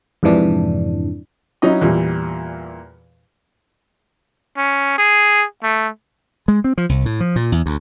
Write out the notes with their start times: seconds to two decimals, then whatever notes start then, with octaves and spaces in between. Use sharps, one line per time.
0.23 F2 G#2 C3 E3 D4
1.62 F#3 C#4 D#4 E4 D#5
1.81 E2 A#2 G3
4.57 C#4
4.98 G#4
5.63 A3
6.48 G#3
6.64 C4
6.78 F3
6.89 C2
7.06 A2
7.20 F3
7.36 A#2
7.52 E2
7.66 D2